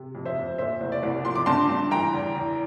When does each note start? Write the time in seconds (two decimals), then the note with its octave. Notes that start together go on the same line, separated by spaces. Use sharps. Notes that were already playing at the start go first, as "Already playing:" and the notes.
Already playing: C3
0.15 F2
0.25 C5 E5
0.37 F2
0.58 A#2 C5 E5
0.81 C2
0.92 D5
1.03 C2
1.25 F3 C6
1.35 D6
1.46 G2 A5 C6
1.69 G2
1.91 E3 G5 A#5
2.13 E2
2.36 E2